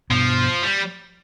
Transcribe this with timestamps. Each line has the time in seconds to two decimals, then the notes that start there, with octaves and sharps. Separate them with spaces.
0.10 G2 B2 F3
0.63 G3